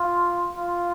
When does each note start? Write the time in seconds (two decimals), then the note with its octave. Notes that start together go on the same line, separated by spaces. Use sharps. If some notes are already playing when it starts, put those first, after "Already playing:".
Already playing: F4
0.55 F4